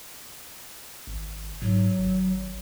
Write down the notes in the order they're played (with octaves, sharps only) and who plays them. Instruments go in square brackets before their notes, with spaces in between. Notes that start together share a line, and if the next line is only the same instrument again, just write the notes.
[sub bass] G#1
[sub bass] G#2 [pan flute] F#3
[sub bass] G#1